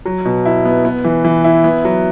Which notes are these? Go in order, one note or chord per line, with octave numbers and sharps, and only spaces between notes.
F#3
B2
E4
B3
B3
E3
E3
E4
B3
F#3